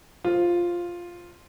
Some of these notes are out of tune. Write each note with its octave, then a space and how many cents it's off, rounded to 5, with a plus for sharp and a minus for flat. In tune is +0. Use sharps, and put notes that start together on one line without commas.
F4 +0 C5 +0